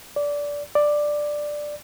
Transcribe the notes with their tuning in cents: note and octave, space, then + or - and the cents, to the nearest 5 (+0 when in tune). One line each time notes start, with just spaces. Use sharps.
D5 -20
D5 +5